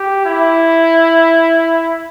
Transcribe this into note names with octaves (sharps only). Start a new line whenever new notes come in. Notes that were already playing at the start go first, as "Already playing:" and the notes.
Already playing: G4
E4